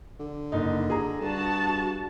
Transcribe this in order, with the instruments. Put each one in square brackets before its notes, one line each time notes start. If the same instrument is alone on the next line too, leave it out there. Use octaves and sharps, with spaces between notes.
[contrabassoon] D3
[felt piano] F#1 D#4
G#4 A#5
[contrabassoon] G2 [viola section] F#4 A5